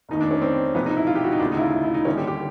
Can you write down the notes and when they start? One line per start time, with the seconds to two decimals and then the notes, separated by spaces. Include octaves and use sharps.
0.09 F1 D#2 D#3 D#4
0.21 D4
0.31 C#4
0.42 C4
0.75 E1 E2 C3 F3 B3
0.86 D#4
0.97 E4
1.07 F4
1.15 G4
1.24 F#4
1.32 D#4
1.40 E1 D2 C#3 D4
1.52 D#4
1.56 E4
1.61 F4
1.72 E4
1.84 E4
1.94 D#4
2.05 D#2 D3 G3 C#4
2.17 G4
2.27 G4